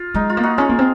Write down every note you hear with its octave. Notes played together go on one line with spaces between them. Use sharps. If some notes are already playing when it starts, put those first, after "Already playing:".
Already playing: F4
G#3 D#4
F4
A#3
D#4 F#4
C#4 F4 G#4
A#3
C4